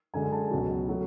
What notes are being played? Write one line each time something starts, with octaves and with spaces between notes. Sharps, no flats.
F#2 D3 G#3 G#5
A5
C#2 B2 F#3
F#3 A3